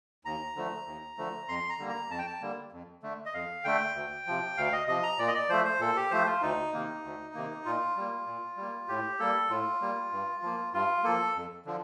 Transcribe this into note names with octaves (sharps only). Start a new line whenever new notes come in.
D#2 A#5
D3 F3 A3
D#2
D3 F3 A3
F2 C6
A#5
D3 G3 A#3
A#5
F2 A5
G5
A5
D3 G3 A#3
F2
D3 A3
D#5
F2 F5
D3 A3 G5
D2
C3 F3
D2 F5
D#5
C3 F3 D#5
A#5
A#2 D5
D#5
D5
F3 A3 C5
C5
A#2 A4
G4
F3 A3 C5
F4
D2 D#4
C3 D#3 A#3
D2
C3 D#3 A#3
A#2 F4
G3 A#3
A#2
G3 A#3
A2 G4
G3 A#3 A4
A2 F4
G3 A#3
G2
F3 A#3
G2 F4
F3 A#3 A4
F2
D3 F3